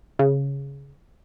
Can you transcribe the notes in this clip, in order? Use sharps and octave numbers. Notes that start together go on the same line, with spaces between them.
C#3